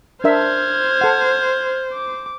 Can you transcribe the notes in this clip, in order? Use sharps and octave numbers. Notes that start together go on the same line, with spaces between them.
D4 A#4 C5 E5 F6 G#6
A4 F#5
D6